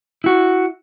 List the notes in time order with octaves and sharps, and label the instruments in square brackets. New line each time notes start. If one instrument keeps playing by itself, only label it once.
[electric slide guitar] E4 F#4